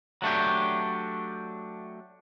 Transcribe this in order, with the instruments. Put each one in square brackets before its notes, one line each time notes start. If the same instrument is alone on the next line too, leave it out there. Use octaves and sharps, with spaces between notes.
[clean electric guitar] F#3 A3 D4 G4